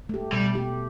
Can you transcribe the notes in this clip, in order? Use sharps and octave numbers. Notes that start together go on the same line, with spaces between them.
A3 G4
B2 G3
A3 G4